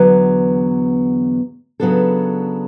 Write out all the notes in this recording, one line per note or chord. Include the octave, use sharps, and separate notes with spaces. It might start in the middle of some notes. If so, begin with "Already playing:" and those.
Already playing: E2 D3 F#3 B3
C#3 F#3 B3 D4 A4